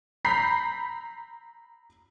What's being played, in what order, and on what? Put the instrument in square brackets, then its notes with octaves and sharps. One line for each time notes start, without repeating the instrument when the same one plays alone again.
[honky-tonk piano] A#5 B5 G6 B6 C7